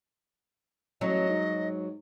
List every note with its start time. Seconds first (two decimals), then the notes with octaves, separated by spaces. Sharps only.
1.01 A1 F#3 D#5
1.29 G#2